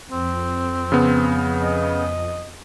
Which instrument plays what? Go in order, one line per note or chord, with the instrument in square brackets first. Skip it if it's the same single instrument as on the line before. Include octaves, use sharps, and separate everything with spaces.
[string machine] F2 [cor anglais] C4
[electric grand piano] C#3 B3
[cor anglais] D#5